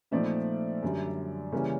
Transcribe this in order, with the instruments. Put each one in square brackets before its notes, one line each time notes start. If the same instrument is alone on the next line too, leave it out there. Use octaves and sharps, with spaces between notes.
[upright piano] A#2 F3 A3 C4 D#4 D5 E5
F#2 D3 G3
C#3 E3 G3 A#3 C#4